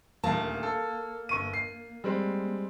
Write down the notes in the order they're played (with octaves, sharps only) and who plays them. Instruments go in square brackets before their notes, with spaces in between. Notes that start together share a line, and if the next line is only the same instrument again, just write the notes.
[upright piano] D#1 D2 A5 [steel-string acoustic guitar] A#3
[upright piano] A4
G1 C#6 D#7
C7
G3 G#3 C4